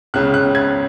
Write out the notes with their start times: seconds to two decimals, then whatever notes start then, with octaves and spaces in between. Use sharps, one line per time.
0.14 C#2 C#3 F#6
0.34 F#6
0.55 G#6